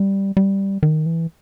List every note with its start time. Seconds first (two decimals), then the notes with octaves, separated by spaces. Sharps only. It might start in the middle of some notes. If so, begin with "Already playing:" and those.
Already playing: G3
0.37 G3
0.83 D#3
1.06 E3